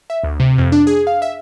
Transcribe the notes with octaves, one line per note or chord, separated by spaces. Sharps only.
E5
D2
C3
F2
D4
G#4
F5
E5